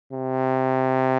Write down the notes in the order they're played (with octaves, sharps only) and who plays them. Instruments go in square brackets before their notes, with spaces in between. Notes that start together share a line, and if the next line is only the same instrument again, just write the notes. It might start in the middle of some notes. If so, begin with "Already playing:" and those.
[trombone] C3